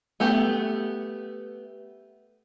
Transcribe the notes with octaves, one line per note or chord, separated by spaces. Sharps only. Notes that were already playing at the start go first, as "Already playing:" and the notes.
A3 B3 G4